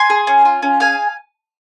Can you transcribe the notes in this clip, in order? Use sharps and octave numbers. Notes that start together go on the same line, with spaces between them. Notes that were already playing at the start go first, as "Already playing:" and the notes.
Already playing: G#5 C6
G#4
C#4
F4
C#4
G#4 F5 G#5